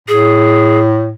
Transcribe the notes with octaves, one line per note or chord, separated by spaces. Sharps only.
A2 G#4